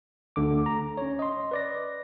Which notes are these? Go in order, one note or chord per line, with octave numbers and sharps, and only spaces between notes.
D2 D3 D6
A#5
C#4 C#5
D#5 C6
B4 D5 A#6